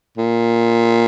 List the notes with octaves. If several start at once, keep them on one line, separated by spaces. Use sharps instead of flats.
A#2